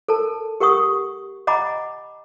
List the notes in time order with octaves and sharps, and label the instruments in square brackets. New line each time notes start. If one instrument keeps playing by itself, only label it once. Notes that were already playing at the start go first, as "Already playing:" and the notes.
[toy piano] A4 A#4 A5
G4 A#4 F#5 C#6 D#6
D#5 F#5 G#5 A#5 B5 D6